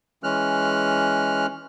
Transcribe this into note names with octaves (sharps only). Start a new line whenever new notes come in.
E3 G#3 C#4 F6 F#6